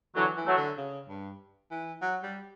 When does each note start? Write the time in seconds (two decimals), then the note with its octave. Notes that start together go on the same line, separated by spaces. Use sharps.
0.15 D3 E3 F#3
0.37 E3
0.46 F#3 A3
0.57 D3
0.78 C#3
1.09 G2
1.71 E3
2.02 F#3
2.23 G3